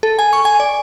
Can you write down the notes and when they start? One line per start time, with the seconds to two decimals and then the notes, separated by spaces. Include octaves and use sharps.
0.03 A4
0.19 G#5
0.33 C#6
0.45 G#5
0.60 D5